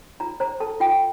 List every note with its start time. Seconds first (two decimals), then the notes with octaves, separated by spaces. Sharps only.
0.20 F4 A#5
0.40 C5 A#5
0.60 A4 A5
0.80 F4 G5